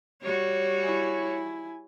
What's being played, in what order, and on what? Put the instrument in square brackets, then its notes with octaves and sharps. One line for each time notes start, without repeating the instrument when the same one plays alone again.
[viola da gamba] G3 F#4 [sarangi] C#5
[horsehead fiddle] E4 G#5